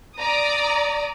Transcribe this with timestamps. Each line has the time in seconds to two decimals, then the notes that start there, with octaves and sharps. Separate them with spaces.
0.17 D5 A#5 D#6